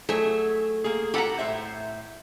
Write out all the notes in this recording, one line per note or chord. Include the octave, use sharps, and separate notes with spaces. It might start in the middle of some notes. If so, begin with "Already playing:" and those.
F#3 A3 G#4 E5
A#3 G#4
G4 A4 F#5 A#5 B5
A2 C5 E5